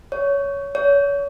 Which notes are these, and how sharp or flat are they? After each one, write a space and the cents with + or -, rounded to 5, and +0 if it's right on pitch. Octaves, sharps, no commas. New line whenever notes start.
C#5 +15
C#5 +35